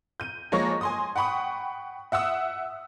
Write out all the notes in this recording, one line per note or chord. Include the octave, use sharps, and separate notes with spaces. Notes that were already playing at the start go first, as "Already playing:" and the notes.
G6 D#7
F3 G#3 A#3 C#5 C#6 A#6
G#5 C6 D#6
F#5 G5 B5 C#6 D#6
E5 F#5 D#6 E6